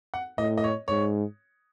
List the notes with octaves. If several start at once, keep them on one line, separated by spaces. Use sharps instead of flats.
F#5
A2 D#5
D#5
C#5
G#2 C#5